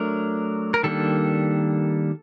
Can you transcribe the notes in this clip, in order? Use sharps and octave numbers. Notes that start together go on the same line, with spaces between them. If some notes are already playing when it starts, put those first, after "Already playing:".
Already playing: F#3 A3 D4 A#4
A#4
D#3 G3 A#3 D4 A4